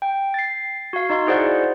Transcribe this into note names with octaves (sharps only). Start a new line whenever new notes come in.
G5
A6 C7
F#4 F5
D#4 D#5 C6
E4 F#4 G#4 C5 D5 F#5